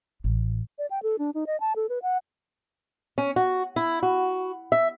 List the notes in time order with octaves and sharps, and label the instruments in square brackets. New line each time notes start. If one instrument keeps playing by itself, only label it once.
[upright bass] A1
[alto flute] D5
G5
A4
D4
D#4
D#5
A5
A4
B4
F#5
[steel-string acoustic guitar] C#4
F#4
E4
F#4
E5